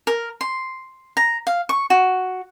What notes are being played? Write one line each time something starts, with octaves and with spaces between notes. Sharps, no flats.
A#4
C6
A#5
F5
C#6
F#4